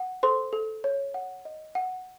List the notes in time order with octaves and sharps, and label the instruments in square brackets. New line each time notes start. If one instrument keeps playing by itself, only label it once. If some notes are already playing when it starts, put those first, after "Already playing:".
Already playing: [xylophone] F#5
A4 C5 C6
A4
C#5
F#5
D#5
F#5